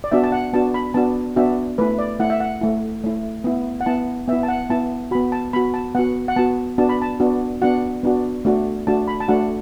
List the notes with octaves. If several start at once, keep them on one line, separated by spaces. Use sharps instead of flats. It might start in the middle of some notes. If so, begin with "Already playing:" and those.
D5
B3 D4 F#4 E5
A5
F#5
B3 D4 F#4 A5
B5
B3 D4 F#4 A5
B3 D4 F#4 E5
A3 E4 B4
D5
A3 E4 F#5
E5
F#5
A3 E4
A3 E4
B3 E4
F#5
B3 E4 A5
B3 E4 E5
A5
F#5
B3 E4 A5
B3 F#4 B5
A5
B3 F#4 B5
A5
B3 F#4 F#5
F#5
B3 F#4 A5
B3 D4 F#4 A5
B5
A5
B3 D4 F#4
B3 D4 F#4 F#5
B3 D4 F#4
A3 D4 F#4
A3 D4 F#4 A5
B5
A5
A3 D4 F#4 F#5